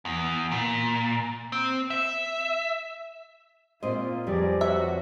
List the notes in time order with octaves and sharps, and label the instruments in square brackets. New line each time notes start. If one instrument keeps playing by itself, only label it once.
[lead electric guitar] E2
A#2
C4
E5
[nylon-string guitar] A#2 C4 D#5 [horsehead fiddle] A#3 F4 [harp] C6
[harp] F2 A#4 B4 [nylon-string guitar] G3 [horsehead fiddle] G#4 D5
[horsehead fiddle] F#4 [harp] C#5 C#6 [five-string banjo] E5